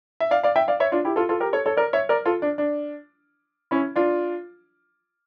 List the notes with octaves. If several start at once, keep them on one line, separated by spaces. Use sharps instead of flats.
E5
D5 F5
D5 F5
E5 G5
D5 F5
C#5 E5
D4 F4
E4 G4
F4 A4
F4 A4
G4 A#4
A4 C#5
A4 C#5
A#4 D5
C#5 E5
A#4 D5
F4 A4
D4
D4
C#4 E4
D4 F4